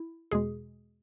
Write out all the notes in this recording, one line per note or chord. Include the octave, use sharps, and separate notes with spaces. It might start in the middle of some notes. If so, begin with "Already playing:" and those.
Already playing: E4
E2 B2 G#3 G#4